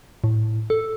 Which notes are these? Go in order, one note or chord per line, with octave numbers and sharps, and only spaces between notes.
A2
A4